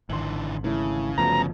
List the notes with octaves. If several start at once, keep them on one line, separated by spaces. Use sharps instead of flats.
G#1 D3 E3 C6 F#7
C#3 E3 A3 E4
G1 F3 F#3 A3 B3 A#5